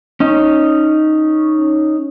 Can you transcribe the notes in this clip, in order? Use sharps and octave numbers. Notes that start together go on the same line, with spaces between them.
C#4 D#4